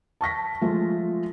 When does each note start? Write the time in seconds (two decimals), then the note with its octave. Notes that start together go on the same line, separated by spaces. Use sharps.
0.21 A5 C#6 A#6 B6
0.61 F3 G#3 A3 F4